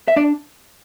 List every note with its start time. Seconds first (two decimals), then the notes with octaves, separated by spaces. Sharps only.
0.08 E5
0.16 D4 D5